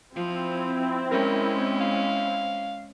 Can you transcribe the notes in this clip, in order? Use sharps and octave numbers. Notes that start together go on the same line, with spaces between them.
F3 C4 E4
G#3 C#4 A#4
F5